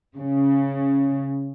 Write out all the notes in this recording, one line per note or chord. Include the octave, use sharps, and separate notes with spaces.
C#3